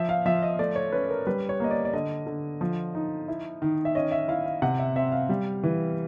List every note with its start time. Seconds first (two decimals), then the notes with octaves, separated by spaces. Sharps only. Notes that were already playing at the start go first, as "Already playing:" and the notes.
Already playing: F3 E5
0.09 F5
0.26 F3 E5
0.42 D#5
0.59 A3 D5
0.76 C#5
0.92 C#4 B4
1.09 A#4
1.27 G3 B4
1.49 C#5
1.60 A#3 D#5
1.71 D5
1.85 D5
1.93 D3 D#5
2.27 D3
2.61 F3
2.95 D#4
3.28 E4
3.62 D#3
3.85 E5
3.95 C#4 D#5
4.12 E5
4.28 E4 F5
4.46 F5
4.62 C3 F#5
4.79 E5
4.96 C4 E5
5.12 F5
5.29 G3
5.63 E3